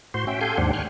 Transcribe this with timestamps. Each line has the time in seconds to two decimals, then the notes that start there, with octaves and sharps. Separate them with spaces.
0.14 A2 F#4 C5 C6
0.27 C#4 F#4 E5 G5
0.41 G4 A4 F5 G#5 C6 G6
0.58 D#2 G#2 D4 G4 C5 F#5
0.73 G5 G#5 C6 C#6 F6 F#6